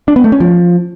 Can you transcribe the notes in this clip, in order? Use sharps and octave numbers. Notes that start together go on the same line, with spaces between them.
D4
B3
A3
C#4
F3